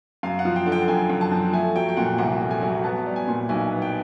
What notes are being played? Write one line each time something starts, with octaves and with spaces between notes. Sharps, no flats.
F#2 F5
F#5
F3
G5
D3
G5
F#2 G#5
F#2
A5
F3
A3 G#5
F#3 G5
G5
A#2 F#5
C2 F#5
A3
G#5
F#3
B3 A5
G3
G#5
A#2
B1 G#5
B3
G5